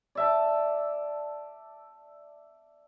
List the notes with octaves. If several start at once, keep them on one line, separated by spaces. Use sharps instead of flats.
D5 E5 A5